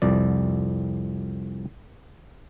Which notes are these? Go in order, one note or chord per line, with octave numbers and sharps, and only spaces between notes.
C2 F2 D5